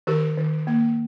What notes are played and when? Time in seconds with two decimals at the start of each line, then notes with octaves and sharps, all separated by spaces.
0.07 D#3 G4 A#4
0.37 D#3
0.67 A#3